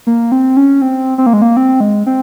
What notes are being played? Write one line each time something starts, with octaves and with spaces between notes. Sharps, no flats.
A#3
C4
C#4
C4
C4
A#3
G#3
A#3
C4
G#3
C4